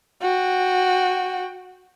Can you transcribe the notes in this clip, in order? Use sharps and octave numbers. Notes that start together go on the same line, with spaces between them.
F#4 G5